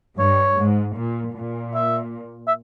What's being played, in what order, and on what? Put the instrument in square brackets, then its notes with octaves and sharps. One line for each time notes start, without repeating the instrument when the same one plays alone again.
[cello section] G2 [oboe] C#5
[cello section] G#2
A#2
A#2
[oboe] E5
E5